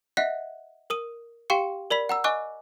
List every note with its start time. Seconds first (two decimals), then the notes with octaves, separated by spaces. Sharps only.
0.17 D#5 E5 F#5 F#6 B6
0.90 A#4 D#6 D#7
1.50 G4 F5 G5 C6 C#6 C#7
1.90 A#4 D5 B5 B6
2.09 F#5 A#5 E6
2.24 D#5 G#5 C#6 D6 F#6